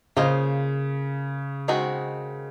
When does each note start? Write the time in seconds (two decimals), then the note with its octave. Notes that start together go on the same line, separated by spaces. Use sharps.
0.17 C#3 A#3 F4 C5 D#5
1.68 D#3 G#3 C4 F#4